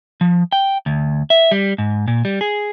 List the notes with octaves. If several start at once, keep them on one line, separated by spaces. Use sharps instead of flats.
F3
G5
D2
E5
G3
G#2
A#2
G3
G#4